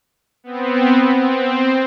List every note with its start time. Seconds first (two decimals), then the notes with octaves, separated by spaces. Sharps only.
0.44 B3 C4
1.19 C4